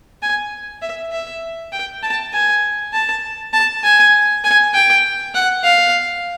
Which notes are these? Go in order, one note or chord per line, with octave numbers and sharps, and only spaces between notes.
G#5
E5
E5
G5
A5
G#5
A5
A5
G#5
G#5
G5
F#5
F5